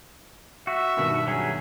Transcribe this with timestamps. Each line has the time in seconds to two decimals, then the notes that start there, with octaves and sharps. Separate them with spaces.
0.67 F#4 E5
0.97 G2 B2 D#3
1.28 F#3 C#4 G#4